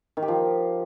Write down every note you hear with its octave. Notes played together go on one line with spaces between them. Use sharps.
D#3
G4
F3